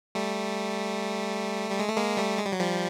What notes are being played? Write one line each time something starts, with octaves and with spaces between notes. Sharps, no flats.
G3 A3
G3
G#3
A3
G#3 A#3
G3 A3
G#3
G3
F#3
F3 G3